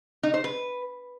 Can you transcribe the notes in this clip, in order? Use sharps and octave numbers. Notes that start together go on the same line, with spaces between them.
D#4
C5
B4